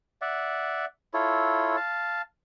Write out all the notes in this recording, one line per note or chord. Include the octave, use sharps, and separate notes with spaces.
D5 E5 F#5
E4 F4 A4 C#5
F5 A5